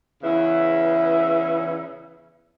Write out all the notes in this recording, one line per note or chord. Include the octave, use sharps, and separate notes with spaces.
E2 C#3 E3 E4